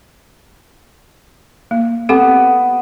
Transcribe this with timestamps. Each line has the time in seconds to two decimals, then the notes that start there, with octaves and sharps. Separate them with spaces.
1.71 A#3
2.09 B3 C4 G4 A4